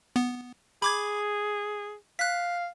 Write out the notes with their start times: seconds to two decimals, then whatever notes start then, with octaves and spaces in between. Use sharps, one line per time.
0.16 B3
0.82 G#4 B5 D6 G#6
2.19 F5 F#6 B6